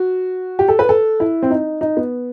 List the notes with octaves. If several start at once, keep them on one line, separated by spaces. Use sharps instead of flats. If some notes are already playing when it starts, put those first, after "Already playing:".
Already playing: F#4
G4
A4
B4
A4
E4
C4
D#4
D#4
B3